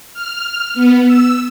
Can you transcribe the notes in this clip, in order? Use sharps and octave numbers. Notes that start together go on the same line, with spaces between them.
F6
B3
E6